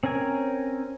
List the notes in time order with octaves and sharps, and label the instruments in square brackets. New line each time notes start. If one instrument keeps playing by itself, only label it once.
[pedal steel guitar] C4 C#4 A#4 G#5